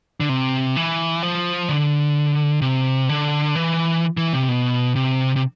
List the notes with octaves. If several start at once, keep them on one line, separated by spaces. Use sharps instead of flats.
D3
C3
E3
F3
D3
C3
D3
E3
E3
C3
B2
C3
C3